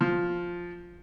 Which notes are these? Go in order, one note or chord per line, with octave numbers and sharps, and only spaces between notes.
F3